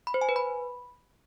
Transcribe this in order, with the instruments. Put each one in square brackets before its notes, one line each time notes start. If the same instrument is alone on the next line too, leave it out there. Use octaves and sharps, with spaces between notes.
[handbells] B5
C5
G#5
B4
B5